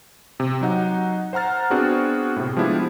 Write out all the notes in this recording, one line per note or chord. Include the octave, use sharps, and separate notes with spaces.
C3
F#3 D#4 F#5
C5 F#5 A#5 F6 A6
B3 C4 D4 F#4 G#4
A2 C3
F3 G#3 B3 D4 E4 G4